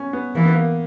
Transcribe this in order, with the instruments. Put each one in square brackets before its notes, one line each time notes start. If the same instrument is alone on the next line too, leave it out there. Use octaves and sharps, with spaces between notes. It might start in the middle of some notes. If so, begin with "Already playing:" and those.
Already playing: [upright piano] B3 C#4
B3
[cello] E3 [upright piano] A#3
[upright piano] B3
A#3